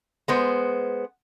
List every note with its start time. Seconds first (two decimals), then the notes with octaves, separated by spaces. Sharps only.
0.28 G#3 B3 C5